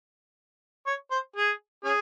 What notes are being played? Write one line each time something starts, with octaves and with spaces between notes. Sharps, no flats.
C#5
C5
G#4
C#4 G#4